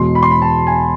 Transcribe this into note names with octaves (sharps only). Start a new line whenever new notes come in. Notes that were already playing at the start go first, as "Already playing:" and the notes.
Already playing: E1 E2 B2 G#3 C6
B5
C6
B5
A5
G#5